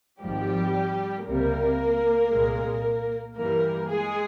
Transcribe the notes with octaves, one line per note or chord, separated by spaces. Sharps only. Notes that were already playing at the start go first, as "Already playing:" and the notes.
G#1 G#2 F3 G3 G4
C#2 C3 G3 A#3 A#4
C2 A#2 G#3
G2 E3 G3 A#3 A#4
G#3 G#4